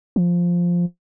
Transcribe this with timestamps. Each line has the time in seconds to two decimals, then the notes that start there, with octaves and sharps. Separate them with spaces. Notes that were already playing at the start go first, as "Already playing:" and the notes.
0.16 F3